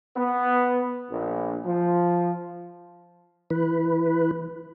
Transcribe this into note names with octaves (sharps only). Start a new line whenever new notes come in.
B3
A#1
F3
E3 B4